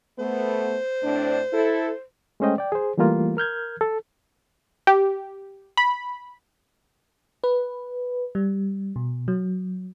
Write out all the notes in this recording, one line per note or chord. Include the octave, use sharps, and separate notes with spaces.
A3 B3 C5
A2 C4 D4
E4 A4
G#3 A3 C#4 C5 D#5 G5
D5 G5
G#4 C5
E3 G3 A3 A#3 F4
A#4 F6 G6 G#6
A4
G4
B5
B4
G3
B2
F#3